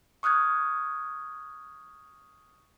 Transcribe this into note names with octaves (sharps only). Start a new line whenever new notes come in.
C#6 D#6 F6 F#6 G#6